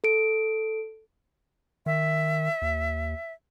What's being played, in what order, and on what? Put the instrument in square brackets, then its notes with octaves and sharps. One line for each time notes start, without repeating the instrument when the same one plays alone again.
[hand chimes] A4 D7
[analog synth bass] D#3 [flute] E5
[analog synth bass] D#2